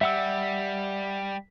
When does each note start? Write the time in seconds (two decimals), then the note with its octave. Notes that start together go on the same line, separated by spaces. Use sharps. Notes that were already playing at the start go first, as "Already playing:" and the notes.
0.01 G3 E5 F#5 E6